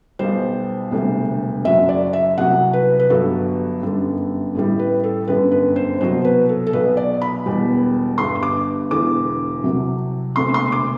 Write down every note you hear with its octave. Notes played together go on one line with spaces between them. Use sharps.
B1 B2 G3 C5
E1 D2 C3 G3
F#1 F#2 F#3 E5
D5
E5
C2 C3 F#3 F#5
B4
B4
G1 G2 F#3 A4
G1 F#2 D3 G3
A1 A2 G3
B4
A4
G1 F#2 D3 G3 B4
B4
C5
C2 B2 F#3 C5
B4
A4
A4
B1 B2 F#3 B4
D5
B5
E1 E2 B2 G3
G1 G2 D3 C6
D6
E1 E2 D3 D6
C2 C3 F#3
E1 D2 C3 C6
C6
D6